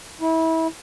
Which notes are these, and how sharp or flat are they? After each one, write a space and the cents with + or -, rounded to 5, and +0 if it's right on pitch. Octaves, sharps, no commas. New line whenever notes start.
E4 -30